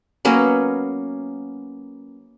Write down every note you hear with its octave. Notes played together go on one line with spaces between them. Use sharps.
F#3 A#3 B3 C#4